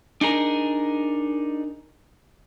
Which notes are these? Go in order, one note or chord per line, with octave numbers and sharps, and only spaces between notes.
D4 D#4 G#4 A#4